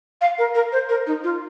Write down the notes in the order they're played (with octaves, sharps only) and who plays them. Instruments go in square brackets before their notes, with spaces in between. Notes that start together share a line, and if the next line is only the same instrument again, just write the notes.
[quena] F5
A#4
A#4
C5
A#4
D#4
F4